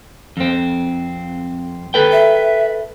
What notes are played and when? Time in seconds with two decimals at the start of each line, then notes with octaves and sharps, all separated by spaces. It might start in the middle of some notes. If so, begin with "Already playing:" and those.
0.37 F2 C4
1.94 A4 B4 G5
2.12 E5